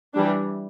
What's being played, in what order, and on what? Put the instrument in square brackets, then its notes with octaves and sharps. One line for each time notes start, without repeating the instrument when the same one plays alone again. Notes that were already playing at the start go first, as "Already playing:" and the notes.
[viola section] E3 G3 D4